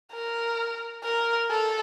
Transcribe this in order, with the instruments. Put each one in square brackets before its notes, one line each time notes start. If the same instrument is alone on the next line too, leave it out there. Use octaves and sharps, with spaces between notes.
[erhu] A#4
A#4
A4